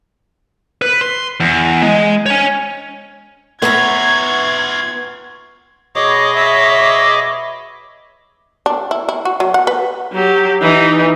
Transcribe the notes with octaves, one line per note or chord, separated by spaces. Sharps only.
B4
C6
E2
G#3
C#5 G#5
B3 F4 F#4 C#5 E5 A#5 G#6
B2 G#4 C#5 D#5 D6
C#5 E5
D4
E4
E4
F#4
F#3
F#5
B4
F#3 G4
E3 D#4